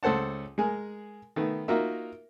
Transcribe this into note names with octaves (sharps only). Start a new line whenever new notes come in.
C#2 A4 C5 F#5 A5
G#3 G#4 A#4
D#3 A3 B3
A#3 D#4 F4 F#4 A#4 E5